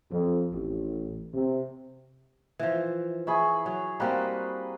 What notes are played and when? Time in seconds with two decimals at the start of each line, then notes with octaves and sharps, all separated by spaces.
0.10 F2
0.52 A1
1.34 C3
2.59 E3 F3
3.27 E4 G#4 B5 C#6
3.66 F#3
4.00 G3 A#3 C4 F#4 B4 D#5